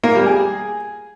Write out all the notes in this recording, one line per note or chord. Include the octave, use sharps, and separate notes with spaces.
A#3
G3
G#4